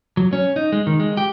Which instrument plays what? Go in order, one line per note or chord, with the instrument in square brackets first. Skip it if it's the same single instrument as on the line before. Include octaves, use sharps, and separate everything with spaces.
[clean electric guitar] F#3
C#4
D#4
G#3
D#3
G#3
G4